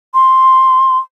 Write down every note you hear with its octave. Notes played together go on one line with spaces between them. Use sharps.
C6